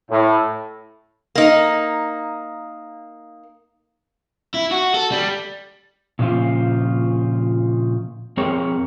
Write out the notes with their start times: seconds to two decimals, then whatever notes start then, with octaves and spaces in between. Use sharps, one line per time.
0.11 A2
1.35 A#3 D#4
4.54 E4
4.71 F#4
4.95 A4
5.12 G3
6.19 A#2 C#3 F3 F4
8.37 F2 C4 G#4 A#4 C#5